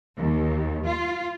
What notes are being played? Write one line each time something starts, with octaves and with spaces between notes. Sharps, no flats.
D#2
F4